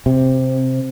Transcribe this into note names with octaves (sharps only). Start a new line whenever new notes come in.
C3